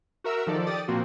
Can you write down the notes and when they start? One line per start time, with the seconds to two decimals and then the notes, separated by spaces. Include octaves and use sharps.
0.24 F#4 A#4 E5 E6
0.46 D#3 F3 A4 D5
0.67 G4 D5 D#6 A6
0.88 A#2 F3 A#3 C4 F#4